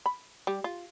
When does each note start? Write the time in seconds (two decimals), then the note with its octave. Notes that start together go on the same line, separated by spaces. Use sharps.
0.06 B5
0.47 G3
0.64 F4